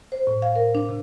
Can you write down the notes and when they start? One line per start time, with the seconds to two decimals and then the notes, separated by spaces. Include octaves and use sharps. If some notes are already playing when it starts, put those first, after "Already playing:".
0.12 C5
0.27 A2
0.42 F5
0.56 A#4
0.75 D4
0.89 C3